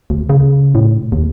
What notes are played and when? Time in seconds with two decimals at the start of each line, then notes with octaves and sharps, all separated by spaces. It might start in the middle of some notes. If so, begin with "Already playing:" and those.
0.10 D2
0.29 C#3
0.75 A2
1.12 D#2